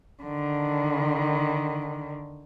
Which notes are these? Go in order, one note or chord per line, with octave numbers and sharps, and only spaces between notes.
D3 D#3